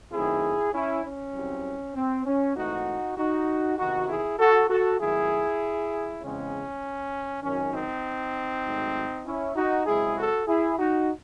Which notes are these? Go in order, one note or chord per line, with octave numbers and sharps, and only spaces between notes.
F#2 D#3 A3 C4 E4 G#4
C#4 E4
C#4
C2 C3 F#3 C4
C4
C#4
G#2 E3 A3 C4 D#4 F#4
D#4 F#4
E2 C3 D#3 D#4 F#4
E4 G#4
F#4 A4
F#4 A4
G#1 F#2 D#3 F#3 A3 E4 G#4
E2 C#3 G#3 C4 C#4
G#1 F#2 D#3 C#4
C4 D#4
G#1 G#2 F#3 A3
C#4 E4
D#4 F#4
F#2 C#3 G#3 C4 E4 G#4
F#4 A4
E4 G#4
D#4 F#4